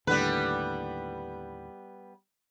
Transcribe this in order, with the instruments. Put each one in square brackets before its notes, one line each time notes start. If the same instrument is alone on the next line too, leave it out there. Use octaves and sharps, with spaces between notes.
[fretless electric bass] D#2 A2 D3 [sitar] G3 B3 B4